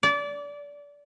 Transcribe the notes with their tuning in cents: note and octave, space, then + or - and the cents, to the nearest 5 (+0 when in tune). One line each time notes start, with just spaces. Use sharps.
D5 -25